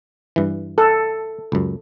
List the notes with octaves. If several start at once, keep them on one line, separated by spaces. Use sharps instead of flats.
G2 E3
A4
C#2 F#2